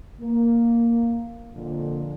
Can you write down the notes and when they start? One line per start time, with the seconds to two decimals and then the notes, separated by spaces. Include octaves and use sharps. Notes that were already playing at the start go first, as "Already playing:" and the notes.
0.21 A#3
1.55 F2 A#2 D3